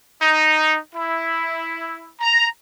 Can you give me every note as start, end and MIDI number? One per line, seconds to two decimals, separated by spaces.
0.22 0.78 63
0.95 2.11 64
2.20 2.47 82